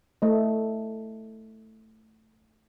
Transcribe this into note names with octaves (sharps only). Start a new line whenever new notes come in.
A3 D#5